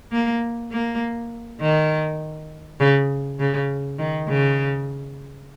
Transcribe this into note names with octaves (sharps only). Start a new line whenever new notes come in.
A#3
A#3
D#3
C#3
C#3
D#3
C#3